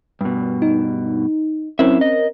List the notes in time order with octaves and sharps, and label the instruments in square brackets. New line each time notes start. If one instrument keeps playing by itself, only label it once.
[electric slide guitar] G2 B2
[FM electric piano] D#4
[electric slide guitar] F#2 E4 E5 [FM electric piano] C4 C#4 A#4
[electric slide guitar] D#5